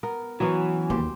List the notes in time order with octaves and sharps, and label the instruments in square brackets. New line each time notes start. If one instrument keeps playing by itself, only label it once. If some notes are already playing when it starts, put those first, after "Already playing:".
[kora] B3 A#4
[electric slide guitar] E3 [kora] F#3 B3 C#4
[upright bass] D#2 [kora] G4 C5